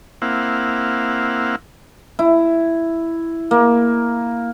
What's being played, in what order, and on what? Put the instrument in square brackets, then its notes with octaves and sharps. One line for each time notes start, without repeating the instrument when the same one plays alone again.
[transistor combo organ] A#3 C4 E4 F5 F#5
[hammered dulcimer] E4
A#3